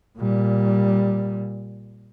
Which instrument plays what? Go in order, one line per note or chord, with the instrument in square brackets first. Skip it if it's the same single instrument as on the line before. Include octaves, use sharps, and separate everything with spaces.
[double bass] A#2 G3